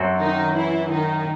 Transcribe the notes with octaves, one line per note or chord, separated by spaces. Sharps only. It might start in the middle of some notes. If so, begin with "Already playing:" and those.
Already playing: F#2 F#3 C4 F#4 A4
D#3 D#4
E3 E4
D#3 D#4